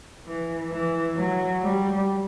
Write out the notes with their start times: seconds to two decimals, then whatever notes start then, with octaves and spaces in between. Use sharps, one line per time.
0.26 E3
0.71 E3
1.16 F#3
1.62 G3